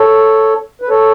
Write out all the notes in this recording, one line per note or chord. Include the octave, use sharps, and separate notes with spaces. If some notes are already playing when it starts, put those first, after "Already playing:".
Already playing: A4 C#5
B4
A4 C#5